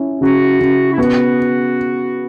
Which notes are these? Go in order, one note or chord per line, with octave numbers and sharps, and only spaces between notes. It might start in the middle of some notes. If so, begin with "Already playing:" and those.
Already playing: C#4 E4
C#3 F#4
C#3
E4
B3 F#4